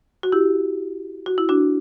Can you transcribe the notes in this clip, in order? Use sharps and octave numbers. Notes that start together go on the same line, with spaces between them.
F#4
E4 G4
F#4
E4
D4 F#4